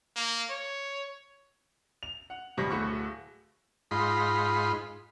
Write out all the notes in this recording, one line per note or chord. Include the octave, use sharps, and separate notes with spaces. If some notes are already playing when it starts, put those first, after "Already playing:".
A#3
C#5
F7
F#5
G#1 B2 G3 C5 A#6 B6
D1 A2 F#4 C#6
G#2 D#4 F4 B5 C6